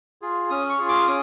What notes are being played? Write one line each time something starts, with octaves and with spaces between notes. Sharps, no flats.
F4 G#4
C#4 D#6
C#6
F4 G#4
D6
C#4 D#6